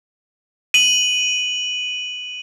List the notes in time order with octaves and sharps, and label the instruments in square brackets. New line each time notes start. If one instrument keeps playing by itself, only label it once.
[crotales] D#7 F#7